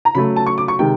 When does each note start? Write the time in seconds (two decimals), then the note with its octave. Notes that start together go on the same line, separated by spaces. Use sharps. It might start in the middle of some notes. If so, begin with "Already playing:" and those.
0.05 A#5
0.15 C#3 F#3 A3 B5
0.36 A5
0.47 C#6
0.58 D6
0.68 C#6
0.79 C3 D#3 G#3 G5